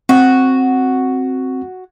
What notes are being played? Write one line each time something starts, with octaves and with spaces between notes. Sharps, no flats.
C4 F#4